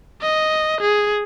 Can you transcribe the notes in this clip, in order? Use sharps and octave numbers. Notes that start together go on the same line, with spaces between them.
D#5
G#4